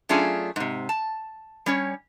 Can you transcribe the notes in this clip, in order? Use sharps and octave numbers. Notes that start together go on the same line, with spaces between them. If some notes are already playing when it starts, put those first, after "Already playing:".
F#3 A3 C#4 D4 F4 G#4
G#2 C3
A5
G3 C#4 C#5